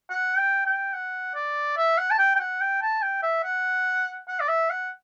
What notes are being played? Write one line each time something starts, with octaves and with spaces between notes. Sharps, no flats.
F#5
G5
G5
F#5
D5
E5
F#5
A5
G5
G5
F#5
G5
A5
G5
E5
F#5
F#5
D5
E5
F#5